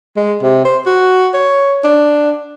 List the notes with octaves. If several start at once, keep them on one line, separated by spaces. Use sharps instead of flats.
G#3
C3
C5
F#4
C#5
D4